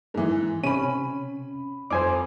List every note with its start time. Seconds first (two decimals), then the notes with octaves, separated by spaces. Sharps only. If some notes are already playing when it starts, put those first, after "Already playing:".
0.14 G#2 E3
0.64 C3 C#4 B5 D#7
1.91 F2 C5 G#5 D6